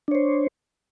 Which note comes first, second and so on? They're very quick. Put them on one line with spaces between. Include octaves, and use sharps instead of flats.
D4 C#5 C5